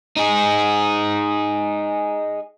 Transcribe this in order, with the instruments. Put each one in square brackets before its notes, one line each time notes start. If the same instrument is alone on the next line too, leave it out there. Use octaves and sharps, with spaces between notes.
[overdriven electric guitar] D#4 G#4